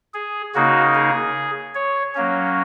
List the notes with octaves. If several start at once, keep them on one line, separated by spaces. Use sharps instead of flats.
G#4
C#3 A#3 D#4 F#4
G#4
C#5
F#3 A#3 C#4